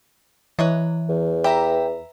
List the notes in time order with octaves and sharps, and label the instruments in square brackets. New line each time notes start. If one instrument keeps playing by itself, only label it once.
[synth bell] E3 [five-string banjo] B4 C#5 D#5
[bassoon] E2
[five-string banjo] G4 [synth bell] B4 E5 A#5